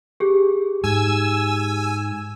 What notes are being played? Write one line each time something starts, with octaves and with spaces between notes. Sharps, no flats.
G4 G#4
G#2 G#5 E6